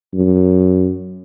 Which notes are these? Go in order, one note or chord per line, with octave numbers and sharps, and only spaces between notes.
F#2